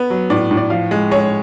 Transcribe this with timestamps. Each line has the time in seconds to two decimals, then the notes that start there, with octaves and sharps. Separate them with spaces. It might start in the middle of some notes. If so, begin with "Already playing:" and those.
Already playing: B3
0.10 F#3
0.30 A2 D5
0.51 A2
0.57 D5
0.70 F3 F5
0.91 G#3
1.11 G#3 C#5